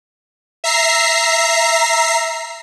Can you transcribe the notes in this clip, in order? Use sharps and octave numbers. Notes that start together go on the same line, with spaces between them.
E5 A#5 C7